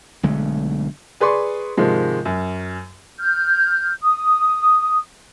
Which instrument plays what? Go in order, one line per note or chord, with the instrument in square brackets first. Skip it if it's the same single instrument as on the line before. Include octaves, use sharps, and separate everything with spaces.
[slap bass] B1 D3 G#3 A3
[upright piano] G#4 B4 D5 C6 C#6
G#2 C3 D#3 F3 G#3
F#2
[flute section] F6 G6
D#6